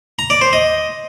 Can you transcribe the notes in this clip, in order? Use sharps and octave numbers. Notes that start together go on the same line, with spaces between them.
A#5
D5
C5
D#5